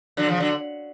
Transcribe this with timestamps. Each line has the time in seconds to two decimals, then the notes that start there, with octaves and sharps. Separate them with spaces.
0.17 D3 F#3
0.29 C#3 F3
0.40 D3 F#3